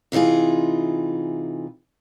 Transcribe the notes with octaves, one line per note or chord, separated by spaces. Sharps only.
C3 E3 D#4 F4 G#4